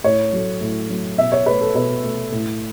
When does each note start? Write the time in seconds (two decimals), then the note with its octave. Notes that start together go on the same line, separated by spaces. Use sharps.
0.04 A2 C#5
0.33 F#3 A3
0.61 A2
0.89 F#3 A3
1.18 B2 E5
1.32 C#5
1.46 A3 B4
1.61 A4
1.75 B2 B4
2.03 A3
2.32 A2